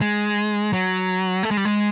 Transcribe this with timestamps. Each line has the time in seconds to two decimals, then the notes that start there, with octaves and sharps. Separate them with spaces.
0.01 G#3
0.73 F#3
1.43 A3
1.51 G#3
1.57 G3
1.65 G#3